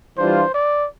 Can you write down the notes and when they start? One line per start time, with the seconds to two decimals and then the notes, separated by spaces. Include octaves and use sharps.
0.18 E3 G3 D4 F4 C5
0.54 D5